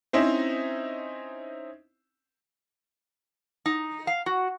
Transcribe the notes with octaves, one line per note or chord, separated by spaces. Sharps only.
C4 C#4 D#4 E4 C5
D#4
F5
F#4